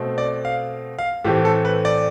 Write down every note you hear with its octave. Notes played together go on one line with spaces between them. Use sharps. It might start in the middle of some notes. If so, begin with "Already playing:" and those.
Already playing: B2 A3 C4
D5
F5
F5
A2 E3 A3 C4 G4
A4
B4
D5